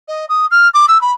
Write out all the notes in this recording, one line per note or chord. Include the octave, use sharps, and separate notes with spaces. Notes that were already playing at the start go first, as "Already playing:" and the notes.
D#5
D#6
F6
D6
E6
B5